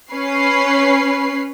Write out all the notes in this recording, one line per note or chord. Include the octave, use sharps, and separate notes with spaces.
C#4 B4 C#5 C7